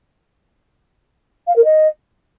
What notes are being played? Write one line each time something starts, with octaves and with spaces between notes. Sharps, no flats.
F5
A#4
D#5